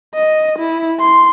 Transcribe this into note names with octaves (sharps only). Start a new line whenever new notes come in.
D#5
E4
C6